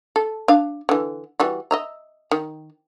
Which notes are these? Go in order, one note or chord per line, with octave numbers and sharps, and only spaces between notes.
A4
D4 F5
D3 E3
E3 G3 F#4
D#5 E5 A#5
D#3